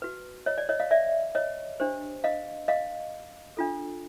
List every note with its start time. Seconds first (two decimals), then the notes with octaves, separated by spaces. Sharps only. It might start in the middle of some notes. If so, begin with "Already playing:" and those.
0.02 F#4 B4
0.46 C#5 D#5
0.58 D5
0.69 C#5 D#5
0.80 D#5 F5
0.91 D5 E5
1.35 C#5 D#5
1.80 D4 G4 C5
2.24 D#5 F5
2.68 D#5 F5
3.57 D4 F4 A4